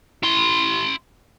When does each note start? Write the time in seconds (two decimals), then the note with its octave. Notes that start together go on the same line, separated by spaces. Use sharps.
0.23 E4 C6